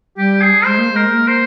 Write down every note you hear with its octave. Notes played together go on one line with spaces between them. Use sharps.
G3 G4
G#4
G#3 C5
A#3
G#3 A#4
A#3
C5